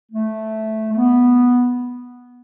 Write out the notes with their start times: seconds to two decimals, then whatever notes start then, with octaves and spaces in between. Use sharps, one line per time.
0.12 A3
0.91 A3
0.97 B3